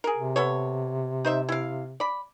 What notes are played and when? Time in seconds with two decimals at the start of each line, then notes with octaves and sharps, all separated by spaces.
0.04 G#4 A#4
0.17 C3
0.36 B3 A4 C#5
1.25 D#4 C5 E5
1.49 E4 F5
2.00 D5 B5